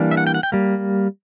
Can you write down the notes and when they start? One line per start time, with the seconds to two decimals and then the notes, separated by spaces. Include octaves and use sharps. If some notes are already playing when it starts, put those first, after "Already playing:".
Already playing: E3 G3 A#3 D4
0.11 E5
0.17 F#5
0.27 G5
0.34 F#5
0.43 G5
0.52 G3 A#3